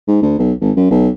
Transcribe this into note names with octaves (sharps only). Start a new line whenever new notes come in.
G#2
D2
B1
G#1
F#2
B1